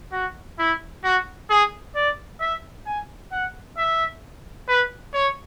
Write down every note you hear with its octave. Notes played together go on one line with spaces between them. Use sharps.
F#4
E4
F#4
G#4
D5
E5
G#5
F#5
E5
B4
C#5